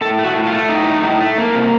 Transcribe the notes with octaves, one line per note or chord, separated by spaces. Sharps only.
A2 A4
A3
F#4
A2
F4
A3
A2 D#4
A3
A2
A3
A#3
C3